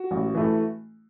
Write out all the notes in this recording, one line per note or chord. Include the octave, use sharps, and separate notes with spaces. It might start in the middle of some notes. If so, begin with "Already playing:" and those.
Already playing: F#4
A1
E3 A3